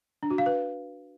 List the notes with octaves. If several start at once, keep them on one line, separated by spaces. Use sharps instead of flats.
D4
F#4
F5
B4